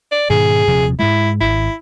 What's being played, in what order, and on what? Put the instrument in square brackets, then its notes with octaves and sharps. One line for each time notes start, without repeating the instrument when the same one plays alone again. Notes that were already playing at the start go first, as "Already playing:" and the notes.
[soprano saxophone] D5
[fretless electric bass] G#2 B2 D#3 [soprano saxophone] G#4
[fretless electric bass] D#1 C3 F3
[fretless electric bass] G#2 G#3 [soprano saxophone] E4
[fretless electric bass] G#1 [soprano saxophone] E4